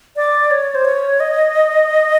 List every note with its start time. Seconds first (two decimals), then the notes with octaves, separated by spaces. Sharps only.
0.16 D5
0.51 C#5
0.75 C5
0.85 C#5
1.20 D#5